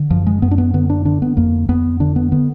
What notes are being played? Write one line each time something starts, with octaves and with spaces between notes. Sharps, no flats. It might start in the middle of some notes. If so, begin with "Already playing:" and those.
Already playing: D3
F#2 F3
G#3
F#2 B3
D4
B3
D3 B3
D4
D3 D4
B3
F2 A#3
F2 B3
D3 D4
B3
D3 B3